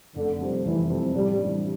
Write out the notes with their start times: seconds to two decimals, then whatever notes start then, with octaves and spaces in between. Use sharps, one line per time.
0.15 F1 D3
0.41 F2 C3 G3 C4
0.65 F1 E3
0.89 F2 C3 G3 C4
1.15 A1 G3
1.39 G2 E3